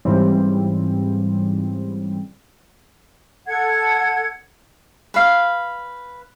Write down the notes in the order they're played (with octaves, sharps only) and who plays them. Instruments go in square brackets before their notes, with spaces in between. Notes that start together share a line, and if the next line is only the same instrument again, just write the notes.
[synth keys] G#2 C#3 E3 G3 C4
[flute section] A4 F#5 G#6
[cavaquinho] B4 F5